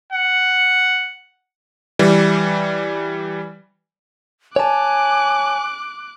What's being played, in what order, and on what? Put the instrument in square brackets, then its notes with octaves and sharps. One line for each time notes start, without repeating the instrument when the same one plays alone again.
[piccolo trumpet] F#5
[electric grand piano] E3 G3
[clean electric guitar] C#5 A5 [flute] G#5 [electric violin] D6 F#6